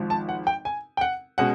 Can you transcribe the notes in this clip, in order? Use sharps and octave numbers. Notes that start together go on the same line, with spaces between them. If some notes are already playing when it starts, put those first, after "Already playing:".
Already playing: G#1 G#2 F3
A5
F#5
G5
G#5
G5
F#5
B2 G#3 C#4 F#5